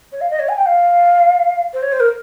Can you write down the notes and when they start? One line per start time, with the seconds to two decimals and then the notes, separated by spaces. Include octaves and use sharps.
0.12 C#5
0.21 F5
0.30 D#5
0.39 C#5
0.48 G#5
0.57 G5
0.66 F5
1.73 C5
1.82 C#5
1.92 C5
2.00 A#4